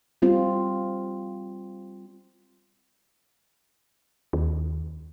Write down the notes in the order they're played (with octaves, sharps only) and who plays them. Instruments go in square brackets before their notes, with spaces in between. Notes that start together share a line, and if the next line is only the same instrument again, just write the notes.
[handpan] G3 C4 F4
[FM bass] D#2